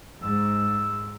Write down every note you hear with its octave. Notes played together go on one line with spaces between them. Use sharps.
G#2 E6